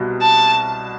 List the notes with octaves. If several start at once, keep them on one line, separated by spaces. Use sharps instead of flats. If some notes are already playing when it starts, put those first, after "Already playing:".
Already playing: C2 B2 G3
A5